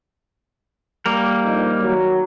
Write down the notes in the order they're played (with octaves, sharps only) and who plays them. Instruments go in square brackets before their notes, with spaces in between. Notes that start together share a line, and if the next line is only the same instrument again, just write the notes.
[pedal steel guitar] G3 A#3 A#4
[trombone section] A#1 F2 D#4
D#3 F#3